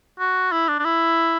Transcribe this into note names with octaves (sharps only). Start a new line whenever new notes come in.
F#4
E4
D4
D4
E4